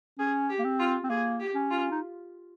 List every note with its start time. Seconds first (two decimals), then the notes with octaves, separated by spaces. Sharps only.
0.19 C#4 G#4
0.49 G4
0.59 A#3
0.64 C4
0.79 F4
1.04 C4
1.10 A#3 G#4
1.39 G4
1.55 C#4
1.70 F4
1.91 D#4